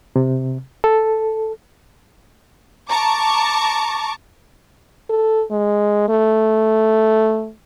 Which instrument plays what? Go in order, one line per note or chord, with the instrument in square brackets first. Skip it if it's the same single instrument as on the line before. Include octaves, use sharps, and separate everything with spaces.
[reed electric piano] C3
A4
[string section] A5 A#5 C#6 D6
[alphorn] A4
G#3
A3